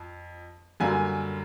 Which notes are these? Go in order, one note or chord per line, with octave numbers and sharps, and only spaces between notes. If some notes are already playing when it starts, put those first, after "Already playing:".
Already playing: F2
F#2 D3 G3 A#3 G#5